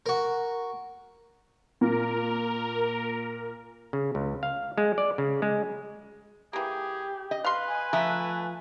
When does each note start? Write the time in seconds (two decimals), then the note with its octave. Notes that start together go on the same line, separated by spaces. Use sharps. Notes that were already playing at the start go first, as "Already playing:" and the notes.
0.06 F#4 A#4
1.81 A#2 A#4
3.93 C#3
4.15 C#2
4.43 F5
4.78 G#3
4.98 D5
5.18 C#3
5.42 G#3
6.53 E3 A#3 G4 G#4
7.31 D#5
7.45 B4 F5 C6
7.68 G#5
7.93 F3 A3 E5 A#5